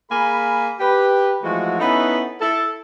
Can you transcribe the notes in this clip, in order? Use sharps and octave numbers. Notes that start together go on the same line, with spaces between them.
A#3 G#4 F5 G#5 B5
G4 B4
E3 F3 G#3 A3 F#4
B3 C#4 D#4 E4 A4 B4
E4 A4